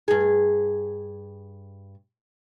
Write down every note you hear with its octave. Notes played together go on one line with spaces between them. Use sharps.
G2 G#4